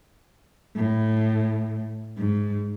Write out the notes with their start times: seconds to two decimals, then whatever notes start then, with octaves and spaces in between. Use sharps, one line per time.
0.76 A2
2.18 G#2